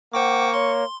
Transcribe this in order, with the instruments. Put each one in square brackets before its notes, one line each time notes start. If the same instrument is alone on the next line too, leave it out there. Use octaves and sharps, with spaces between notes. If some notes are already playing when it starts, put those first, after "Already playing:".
[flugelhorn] A#3 [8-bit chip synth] C5 G5 D6 [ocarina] F#5 [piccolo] C#6
[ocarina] C#5 [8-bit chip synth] C6